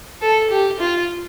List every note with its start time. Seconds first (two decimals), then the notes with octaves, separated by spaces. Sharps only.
0.22 A4
0.50 G4
0.79 F4